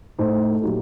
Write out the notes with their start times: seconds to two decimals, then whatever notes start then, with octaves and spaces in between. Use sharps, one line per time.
0.18 A2 A3 D#4 C5
0.52 A4
0.62 A#2 F#3 A#3 D#4 G4